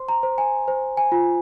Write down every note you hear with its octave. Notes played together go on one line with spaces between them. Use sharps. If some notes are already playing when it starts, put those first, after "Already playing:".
Already playing: C5 C6
A#5
C5
G#5
C5
G#5
F4